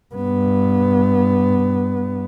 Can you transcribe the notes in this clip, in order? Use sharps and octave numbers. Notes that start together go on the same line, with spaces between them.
G2 B3